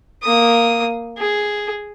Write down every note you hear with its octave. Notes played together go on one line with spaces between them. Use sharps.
A#3 D#6
G#4